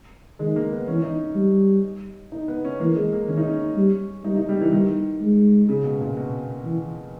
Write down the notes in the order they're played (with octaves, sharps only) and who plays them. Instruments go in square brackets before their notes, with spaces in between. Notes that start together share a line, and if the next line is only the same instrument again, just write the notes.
[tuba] D#3 [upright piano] G#3
[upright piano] A#3
B3
[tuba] E3 [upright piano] C#4
[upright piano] D#4
[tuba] G3
[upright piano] D#4
B3
C#4
[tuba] E3 [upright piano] A#3
[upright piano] G#3
A#3
[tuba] D#3 [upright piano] C#4
[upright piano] D#4
C#4
[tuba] G3
[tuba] G3 [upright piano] D#4
[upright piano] D#4
G3
E3
[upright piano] D#3 [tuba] G3
[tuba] G#3
[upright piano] C#3
B2
A#2
B2
[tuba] E3